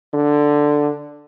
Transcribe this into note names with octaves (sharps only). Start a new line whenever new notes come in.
D3